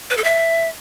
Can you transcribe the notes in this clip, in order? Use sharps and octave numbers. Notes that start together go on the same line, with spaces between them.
B4
A4
E5